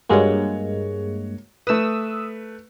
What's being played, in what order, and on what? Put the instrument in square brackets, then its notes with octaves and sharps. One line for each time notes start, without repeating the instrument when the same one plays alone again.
[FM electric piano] G2 G#3 A#3 [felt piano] F#4 C#5
[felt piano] A3 B4 [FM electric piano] D#6 E6